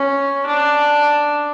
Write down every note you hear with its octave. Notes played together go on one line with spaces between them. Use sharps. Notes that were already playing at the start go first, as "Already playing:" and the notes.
Already playing: C#4
D4